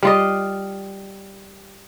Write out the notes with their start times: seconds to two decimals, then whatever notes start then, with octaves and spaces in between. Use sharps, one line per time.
0.03 G3 F4 D#5